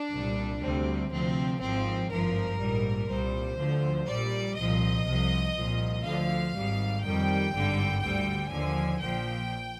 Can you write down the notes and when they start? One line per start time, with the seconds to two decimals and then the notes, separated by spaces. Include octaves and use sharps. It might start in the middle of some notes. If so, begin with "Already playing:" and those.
Already playing: D4
0.12 C2 A#2 G3
0.62 D2 C3 G3 C4
1.12 D2 C3 F3 C4
1.60 G#1 G#2 F3 C4
2.10 G#1 G2 F3 A#4
2.59 A#1 G#2 G3
3.09 C2 A#2 G3 C5
3.58 D2 D3 F3
4.08 A#1 A#2 G3 D5
4.56 C2 A#2 F3 D#5
5.06 C2 C3 F3
5.55 C2 A#2 F3
6.05 D2 D3 F3 F5
6.54 G#1 G#2 G3
7.04 F2 D#3 G3 G5
7.53 G#1 G2 D3 G3
8.02 D2 D3 G3 G5
8.51 D#2 D3 F3 G#5
9.00 A#1 A#2 F3 G5